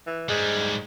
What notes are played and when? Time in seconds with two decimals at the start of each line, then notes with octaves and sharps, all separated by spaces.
0.07 E3
0.29 G#2 G3 G#3